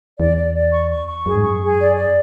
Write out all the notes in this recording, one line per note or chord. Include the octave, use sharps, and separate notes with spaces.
E2 D5
D5
D5
C#6
C#6
C#6
F#2 G#4
G#2
F#2 C#6
G#4
D5
D5